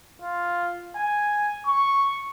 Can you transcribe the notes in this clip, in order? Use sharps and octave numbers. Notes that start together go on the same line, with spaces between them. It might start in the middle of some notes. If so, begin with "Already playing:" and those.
F4
G#5
C#6